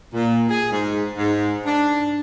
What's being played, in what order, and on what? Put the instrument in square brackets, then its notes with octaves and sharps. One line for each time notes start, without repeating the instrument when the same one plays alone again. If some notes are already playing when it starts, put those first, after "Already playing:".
[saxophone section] A#2
G#4
G#2
G#2
D4